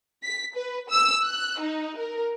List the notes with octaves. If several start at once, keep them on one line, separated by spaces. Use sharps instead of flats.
B6
B4
E6
F#6
D#4
A#4